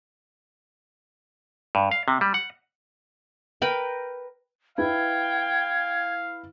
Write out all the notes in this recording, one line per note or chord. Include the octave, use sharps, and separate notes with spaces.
G2
F5
C3
G3
F#5
A#4 B4 G5 B5
E4 B4 F5 G5 G#6